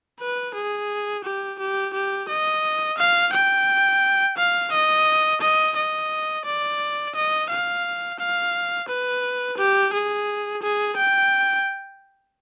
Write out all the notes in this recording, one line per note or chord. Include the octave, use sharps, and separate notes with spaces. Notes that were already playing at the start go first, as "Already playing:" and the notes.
B4
G#4
G4
G4
G4
D#5
F5
G5
F5
D#5
D#5
D#5
D5
D#5
F5
F5
B4
G4
G#4
G#4
G5